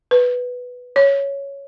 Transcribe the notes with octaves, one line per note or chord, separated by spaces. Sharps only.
B4
C#5